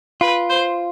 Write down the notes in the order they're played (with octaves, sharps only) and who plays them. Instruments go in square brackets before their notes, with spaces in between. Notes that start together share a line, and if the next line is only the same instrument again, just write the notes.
[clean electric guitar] F4 [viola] B4
[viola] C5